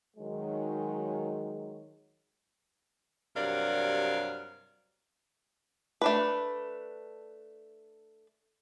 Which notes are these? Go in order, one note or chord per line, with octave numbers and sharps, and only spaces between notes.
D#3 F#3 G#3
G2 C3 F#3 A#4 D5 F5
A3 D4 B4